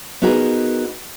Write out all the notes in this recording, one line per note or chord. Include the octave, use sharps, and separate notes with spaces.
B3 D#4 F#4 G#4 A#4 B4